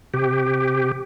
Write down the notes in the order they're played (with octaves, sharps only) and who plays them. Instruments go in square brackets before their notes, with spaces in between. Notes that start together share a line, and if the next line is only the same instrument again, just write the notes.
[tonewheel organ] C3 G4